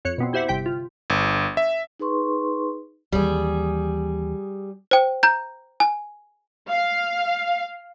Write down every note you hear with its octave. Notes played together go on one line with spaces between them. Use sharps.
F2 C#5 F#6 C#7
B2 B3 C4
E4 G4 C5 E5 F#5
G1 C3 G5 G6 B6
F4
G1
E5
D#4 G#4 B4 C6 C#6
D#2 E3 G3 G#4
C5 G5
A#5 G6
G#5
F5